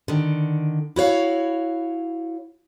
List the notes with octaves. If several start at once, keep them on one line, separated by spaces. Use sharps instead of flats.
D3 D#3
E4 F#4 C#5 F5